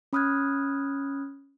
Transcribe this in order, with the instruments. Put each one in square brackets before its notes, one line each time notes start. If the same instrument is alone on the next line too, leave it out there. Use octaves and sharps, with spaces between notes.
[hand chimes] C#4 B5 D#6 F6 F#6 G#6